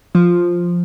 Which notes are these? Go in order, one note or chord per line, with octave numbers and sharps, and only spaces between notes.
F3